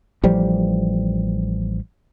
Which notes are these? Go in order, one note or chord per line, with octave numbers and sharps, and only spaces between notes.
A1 F3 G3